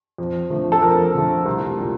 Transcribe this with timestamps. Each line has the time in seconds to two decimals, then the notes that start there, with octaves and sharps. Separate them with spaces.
0.18 F2
0.50 D3 F3 A3
0.72 A4
0.82 F2 A#4
1.15 D3 F3 A3
1.46 C2
1.77 A#2 G3